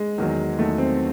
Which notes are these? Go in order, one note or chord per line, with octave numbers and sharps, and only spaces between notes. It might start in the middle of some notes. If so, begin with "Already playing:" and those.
Already playing: G#3
E2 D#3 F#3
E2 D#3 F#3 A3
C4